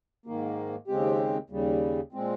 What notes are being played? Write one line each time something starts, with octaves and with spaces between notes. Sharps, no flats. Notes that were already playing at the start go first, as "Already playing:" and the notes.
G#2 D#3 A#3
D#2 C#3 G#3 C4 G4
D#2 C#3 G3
A#2 G#3 C4